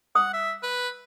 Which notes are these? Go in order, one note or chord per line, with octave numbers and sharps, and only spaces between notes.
F#5 D#6
E5
B4